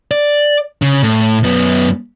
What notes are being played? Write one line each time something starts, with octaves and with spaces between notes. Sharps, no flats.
D5
C#3
A2
F#2 B3